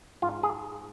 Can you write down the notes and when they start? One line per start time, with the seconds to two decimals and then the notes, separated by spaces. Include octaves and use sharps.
0.22 G#2 F4
0.43 G#4